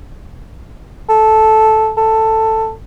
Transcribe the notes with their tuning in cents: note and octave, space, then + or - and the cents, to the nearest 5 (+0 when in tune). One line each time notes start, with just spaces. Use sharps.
A4 -10
A4 +10